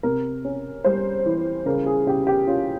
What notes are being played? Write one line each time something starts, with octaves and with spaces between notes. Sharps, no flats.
C3 A#4
C#4
G3 C5
E3
C#3 A#4
G#4
C#3 G4
G4
C#4 F4